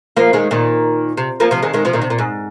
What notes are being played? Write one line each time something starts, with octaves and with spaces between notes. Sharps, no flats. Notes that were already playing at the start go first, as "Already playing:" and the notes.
F3 A#3
D#3 G#3
A#2 D#3
C3
F3 A#3
C3 F3
D#3 G#3
D#3 G#3
C3 F3
A#2 D#3
C3
A#2
G#2